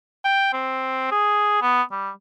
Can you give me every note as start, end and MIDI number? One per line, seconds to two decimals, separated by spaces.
0.24 0.52 79
0.53 1.09 60
1.11 1.61 68
1.62 1.82 59
1.92 2.10 55